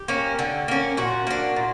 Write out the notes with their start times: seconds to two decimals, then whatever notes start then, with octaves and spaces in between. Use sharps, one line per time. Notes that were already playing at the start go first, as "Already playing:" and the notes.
Already playing: G4
0.08 A#3 C#4
0.39 D3
0.68 A#3 C#4
0.97 A#2 F#4
1.27 A#3 D4
1.56 A#2